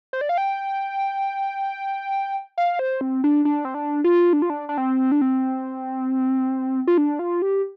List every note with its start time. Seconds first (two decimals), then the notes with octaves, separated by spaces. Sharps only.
0.13 C5
0.21 D5
0.29 F5
0.38 G5
2.58 F5
2.79 C5
3.01 C4
3.24 D4
3.45 D4
3.65 C4
3.74 D4
4.04 F4
4.33 D4
4.42 F4
4.50 D4
4.69 D4
4.78 C4
5.12 D4
5.21 C4
6.87 F4
6.98 D4
7.19 F4
7.42 G4